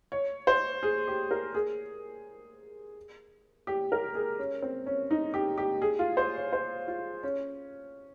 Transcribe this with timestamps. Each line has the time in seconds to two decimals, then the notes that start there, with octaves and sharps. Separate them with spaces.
0.12 C#5
0.47 C5
0.83 G#4
1.07 G4
1.31 A#4
1.54 G#4
3.67 G4
3.92 A#4
4.15 G#4
4.39 C#4
4.62 C4
4.86 C#4
5.11 D#4
5.34 G4
5.58 G4
5.82 G#4
5.99 F4
6.17 C5
6.35 C#5
6.53 C5
6.88 F4
7.23 C#4